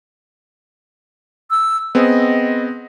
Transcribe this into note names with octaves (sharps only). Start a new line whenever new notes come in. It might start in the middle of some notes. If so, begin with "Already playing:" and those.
E6
B3 C4 G#4 D#5